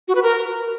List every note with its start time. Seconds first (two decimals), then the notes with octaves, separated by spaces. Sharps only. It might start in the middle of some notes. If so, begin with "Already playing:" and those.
0.08 F#4
0.15 B4
0.22 A#4